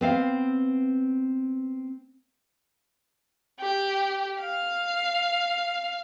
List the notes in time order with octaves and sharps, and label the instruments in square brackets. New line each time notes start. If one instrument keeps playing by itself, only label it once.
[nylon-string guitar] B3 C4 F5
[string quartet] G4
F5